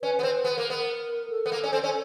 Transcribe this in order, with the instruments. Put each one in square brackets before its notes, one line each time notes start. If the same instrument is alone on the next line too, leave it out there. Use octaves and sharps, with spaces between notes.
[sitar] C#4 [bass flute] B4
[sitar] B3
[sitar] C4 [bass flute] B4
[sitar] B3 [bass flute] B4
[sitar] A#3 [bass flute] A#4
[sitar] B3
[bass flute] A#4
A4
[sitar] B3
A#3
C#4
C4
C#4